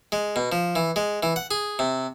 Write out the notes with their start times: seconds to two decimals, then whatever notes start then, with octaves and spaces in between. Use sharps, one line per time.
0.12 G#3
0.36 B2
0.52 F3
0.76 E3
0.96 G#3
1.23 E3
1.36 F#5
1.51 G#4
1.79 C3